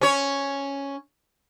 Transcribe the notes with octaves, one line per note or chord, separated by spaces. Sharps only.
C#4 C#5